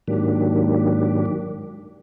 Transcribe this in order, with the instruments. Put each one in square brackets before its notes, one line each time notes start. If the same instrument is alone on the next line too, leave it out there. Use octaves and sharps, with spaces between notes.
[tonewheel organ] G#2 D#3 F#3 A#3 D4 G4